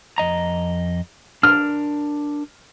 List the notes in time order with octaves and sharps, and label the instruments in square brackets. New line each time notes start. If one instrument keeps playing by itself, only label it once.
[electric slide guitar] F2 D#5 A#5
[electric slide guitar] D4 A#4 [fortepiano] F6